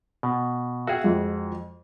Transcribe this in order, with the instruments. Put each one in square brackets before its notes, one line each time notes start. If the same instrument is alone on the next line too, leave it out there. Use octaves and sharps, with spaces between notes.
[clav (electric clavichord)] B2
[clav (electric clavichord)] F#4 G#4 [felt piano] E5 F5 G5
[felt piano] F2 G#3